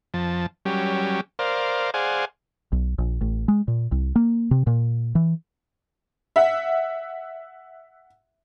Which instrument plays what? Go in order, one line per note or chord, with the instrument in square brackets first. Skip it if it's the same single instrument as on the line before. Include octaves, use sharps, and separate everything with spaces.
[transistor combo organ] F2 F3 A5
F#3 G3 C#4 G4
A#4 C5 D5 F5
G#4 C5 D5 F5 F#5 G#5
[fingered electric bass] B1
A#1
A1
G#3
A#2
C2
A#3
C3
A#2
E3
[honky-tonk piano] E5 F#5